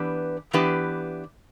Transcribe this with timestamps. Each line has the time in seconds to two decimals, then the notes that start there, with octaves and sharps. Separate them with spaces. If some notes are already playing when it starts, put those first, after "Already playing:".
Already playing: E3 B3 D4 G4 B4
0.53 E3 B3 D4 G4 B4